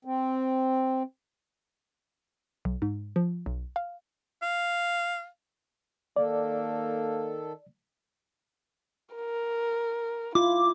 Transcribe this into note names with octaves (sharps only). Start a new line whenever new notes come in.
C4
B1
G#2
F3
B1
F5
F5
D#3 A#3 A4 D5
A#4
E4 F4 D6